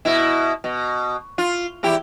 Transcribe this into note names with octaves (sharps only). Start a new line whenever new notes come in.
B2 E4
B2
F4
E2 E4 G4